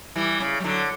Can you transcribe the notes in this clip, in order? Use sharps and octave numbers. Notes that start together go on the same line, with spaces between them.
E3 G3
C#3
G3
D3 F#3